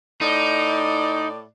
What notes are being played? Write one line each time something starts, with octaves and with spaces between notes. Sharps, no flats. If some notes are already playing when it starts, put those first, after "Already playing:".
A2 D#4 D5